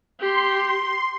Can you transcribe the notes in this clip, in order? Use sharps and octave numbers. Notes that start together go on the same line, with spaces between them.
G4 C6